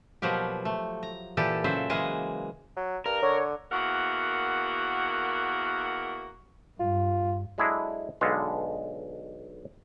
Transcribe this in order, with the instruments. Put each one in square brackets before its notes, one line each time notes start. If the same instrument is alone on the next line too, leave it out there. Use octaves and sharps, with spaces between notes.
[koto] B2 F3 F#3 A#3 G4
A3
A#5
A#2 E3 G4 A4
C#3 F#3 C5 E5
E3 F#3 G#3 A#3 G#4 D#5
[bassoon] F#3
[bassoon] G2 [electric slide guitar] A#4
[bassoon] D3 [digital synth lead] C#5
[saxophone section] E2 A#3 F#4 A#4 F#5
[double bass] G2 [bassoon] F4
[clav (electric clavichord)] F#3 G#3 D4 E4 G#4 A4
B1 D3 G#3 A4 B4 F5